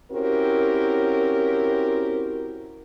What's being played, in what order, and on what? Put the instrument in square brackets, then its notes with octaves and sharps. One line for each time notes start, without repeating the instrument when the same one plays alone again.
[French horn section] C4 C#4 E4 F#4 G4 A#4